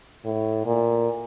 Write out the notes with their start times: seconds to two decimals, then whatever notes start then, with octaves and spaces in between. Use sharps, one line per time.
0.25 A2
0.66 A#2